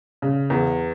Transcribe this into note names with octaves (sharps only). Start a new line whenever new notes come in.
C#3
E2